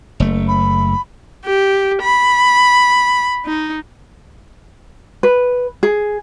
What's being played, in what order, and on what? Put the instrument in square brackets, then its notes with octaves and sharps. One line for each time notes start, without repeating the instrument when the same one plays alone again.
[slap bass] F#1 A3
[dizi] B5
[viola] G4
B5
D#4
[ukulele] B4
G#4